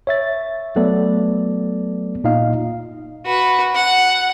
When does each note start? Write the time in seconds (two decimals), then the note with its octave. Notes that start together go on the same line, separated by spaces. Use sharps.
0.07 C#5 E5 A6
0.76 F#3 A3 B3 A4 D5
2.24 A#2 D#4 D#5 F5
3.26 F#4 B4
3.75 F#5